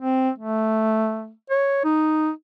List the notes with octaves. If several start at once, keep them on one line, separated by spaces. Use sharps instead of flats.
C4
A3
C#5
D#4